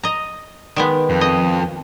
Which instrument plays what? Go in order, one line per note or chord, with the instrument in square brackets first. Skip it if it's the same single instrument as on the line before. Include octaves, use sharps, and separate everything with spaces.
[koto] D#5 A#5
D#3 G#3 B3
[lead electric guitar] F2
[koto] D#5